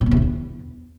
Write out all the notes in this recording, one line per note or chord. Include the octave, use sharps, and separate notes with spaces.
A2
B2
E2
D3
E2